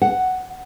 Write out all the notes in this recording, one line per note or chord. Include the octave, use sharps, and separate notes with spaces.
F#5